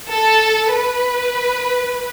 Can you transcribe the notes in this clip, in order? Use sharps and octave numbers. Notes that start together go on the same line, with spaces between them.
A4
B4